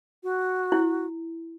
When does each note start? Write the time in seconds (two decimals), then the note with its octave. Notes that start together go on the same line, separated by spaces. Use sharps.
0.23 F#4
0.72 E4